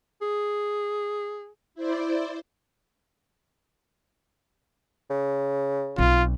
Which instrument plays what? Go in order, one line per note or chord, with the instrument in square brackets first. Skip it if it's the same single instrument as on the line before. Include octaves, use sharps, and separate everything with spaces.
[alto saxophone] G#4
[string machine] E4 C5 D5
[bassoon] C#3
[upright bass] B1 C4 [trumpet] F4